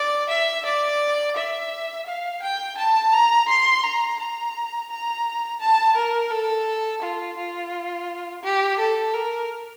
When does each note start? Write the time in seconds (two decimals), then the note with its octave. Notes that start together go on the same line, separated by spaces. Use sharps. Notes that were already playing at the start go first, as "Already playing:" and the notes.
Already playing: D5
0.29 E5
0.66 D5
1.36 E5
2.06 F5
2.42 G5
2.77 A5
3.13 A#5
3.48 C6
3.83 A#5
4.19 A#5
4.90 A#5
5.60 A5
5.96 A#4
6.31 A4
7.02 F4
7.37 F4
8.43 G4
8.78 A4
9.13 A#4